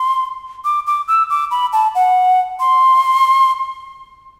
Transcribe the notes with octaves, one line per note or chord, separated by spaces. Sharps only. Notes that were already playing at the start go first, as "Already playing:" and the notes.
Already playing: C6
D6
D6
E6
D6
B5
A5
F#5
C6